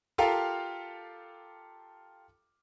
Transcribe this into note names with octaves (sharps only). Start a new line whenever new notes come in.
F4 G4 A4 A#4 F5 G5